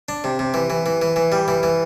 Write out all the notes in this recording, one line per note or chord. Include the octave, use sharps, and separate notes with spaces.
D4
C3
C3
E3
E3
E3
E3
E3
G3
E3
E3